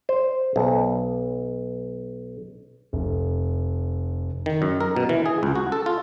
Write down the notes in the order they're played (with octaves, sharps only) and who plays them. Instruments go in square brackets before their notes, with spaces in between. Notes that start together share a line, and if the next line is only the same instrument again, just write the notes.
[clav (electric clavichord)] C5
B1
[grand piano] F1
[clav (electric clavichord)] D#3
F#2
A#4
B2
E3
G#4
C#2
F#4
A4
F4